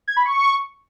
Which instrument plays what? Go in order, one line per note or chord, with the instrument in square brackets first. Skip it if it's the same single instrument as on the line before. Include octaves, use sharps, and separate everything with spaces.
[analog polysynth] G#6
B5
C#6